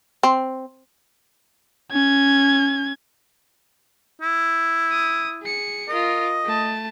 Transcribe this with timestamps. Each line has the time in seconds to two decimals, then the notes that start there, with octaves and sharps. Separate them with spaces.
0.23 C4
1.92 C#4 G#6
4.22 E4
4.91 D#6
5.42 G#4 C#7
5.89 F4 A#4 D#5
6.45 A3 A5